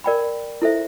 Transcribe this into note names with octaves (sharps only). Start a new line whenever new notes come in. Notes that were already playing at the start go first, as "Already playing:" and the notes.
A#4 D5 G5 B5
E4 A4 C5 E5